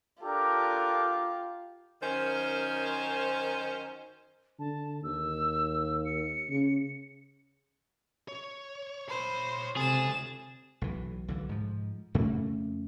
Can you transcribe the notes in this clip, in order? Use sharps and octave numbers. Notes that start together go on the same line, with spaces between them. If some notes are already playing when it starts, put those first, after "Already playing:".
D4 F4 G4 A4 A#4
F#2 D#3 C#4 C5
D3 A5
D#2 E6
C#7
C#3
C#5
C5 C#5 B5
C#2 C3 G#4 A4 A6 E7
B1 E3
B1 D3 E3
G#2 F3
F2 C#3 A3 A#3